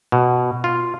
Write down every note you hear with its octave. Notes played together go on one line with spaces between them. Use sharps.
B2
F4